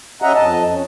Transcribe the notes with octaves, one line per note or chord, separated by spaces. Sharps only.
C#4 D#5 E5 F#5 A#5
F2 D#5 A5
C#4